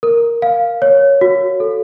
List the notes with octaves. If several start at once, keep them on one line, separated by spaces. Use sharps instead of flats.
A#4
F5
C#5
F#4
A4